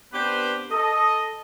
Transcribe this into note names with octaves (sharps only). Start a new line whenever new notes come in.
B3 C4 D4 G4 B4 C5
A4 D#5